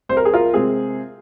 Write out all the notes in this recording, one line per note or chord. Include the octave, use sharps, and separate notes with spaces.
C2 C5
A#4
G#4
F4 A#4
C3 G#3 C4 G#4